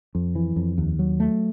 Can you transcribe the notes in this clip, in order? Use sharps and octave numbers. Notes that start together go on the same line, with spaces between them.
F2
E3
F2
D#2
F#3
A3